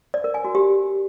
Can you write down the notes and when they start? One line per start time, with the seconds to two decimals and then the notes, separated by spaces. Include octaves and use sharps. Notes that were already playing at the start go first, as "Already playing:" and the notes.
0.14 D5
0.24 A#4
0.34 G#5
0.45 F#4
0.55 G4